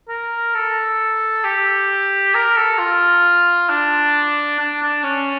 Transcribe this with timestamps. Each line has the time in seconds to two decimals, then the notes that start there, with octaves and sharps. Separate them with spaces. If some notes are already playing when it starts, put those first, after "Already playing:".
0.08 A#4
0.54 A4
1.44 G4
2.34 A#4
2.56 A4
2.78 F4
3.69 D4
4.59 D4
4.82 D4
5.04 C#4